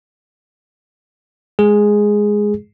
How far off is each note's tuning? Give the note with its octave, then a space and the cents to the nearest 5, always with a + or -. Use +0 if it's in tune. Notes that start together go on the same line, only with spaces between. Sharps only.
G#3 +0 G#4 +0